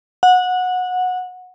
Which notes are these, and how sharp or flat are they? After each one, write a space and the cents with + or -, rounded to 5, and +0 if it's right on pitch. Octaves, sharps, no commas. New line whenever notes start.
F#5 -20